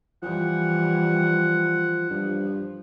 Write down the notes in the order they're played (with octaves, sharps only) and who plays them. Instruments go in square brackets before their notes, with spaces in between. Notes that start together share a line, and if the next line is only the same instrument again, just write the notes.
[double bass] E3 G3 [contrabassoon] F3 [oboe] F#5
[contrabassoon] G2 [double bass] F3